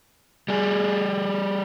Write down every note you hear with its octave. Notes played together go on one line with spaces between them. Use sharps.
G3 G#4